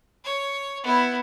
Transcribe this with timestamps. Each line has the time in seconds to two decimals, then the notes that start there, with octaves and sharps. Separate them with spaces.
0.25 C#5
0.83 B3 E4